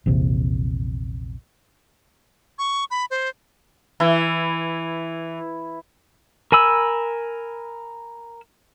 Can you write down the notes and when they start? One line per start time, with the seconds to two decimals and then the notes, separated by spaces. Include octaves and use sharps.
0.06 A#1 E2 C3
2.59 C#6
2.91 B5
3.11 C5
4.00 E3 E4
6.52 A#4 G#5 B5 E6